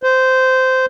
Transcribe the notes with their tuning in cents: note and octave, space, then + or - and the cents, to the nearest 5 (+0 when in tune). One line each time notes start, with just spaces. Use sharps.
C5 -15